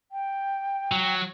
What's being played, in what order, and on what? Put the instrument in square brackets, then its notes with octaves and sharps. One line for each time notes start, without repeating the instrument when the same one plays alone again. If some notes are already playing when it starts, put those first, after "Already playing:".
[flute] G5
[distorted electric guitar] F#3